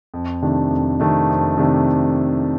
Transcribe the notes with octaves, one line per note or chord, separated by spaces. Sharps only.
F2
C3 D#3 A3 D4
F2
C3 D#3 A3 D4
F2
C3 D#3 A3 D4